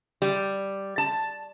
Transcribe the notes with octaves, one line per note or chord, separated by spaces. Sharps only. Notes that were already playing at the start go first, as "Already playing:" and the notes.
G3
A5